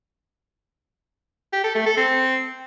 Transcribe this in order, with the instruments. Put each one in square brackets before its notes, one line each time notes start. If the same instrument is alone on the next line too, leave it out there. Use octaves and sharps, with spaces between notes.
[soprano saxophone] G4
A4
A3
A4
C4